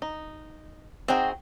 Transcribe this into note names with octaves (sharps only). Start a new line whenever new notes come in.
D#4
C4 D#4 F#4 G#4 G5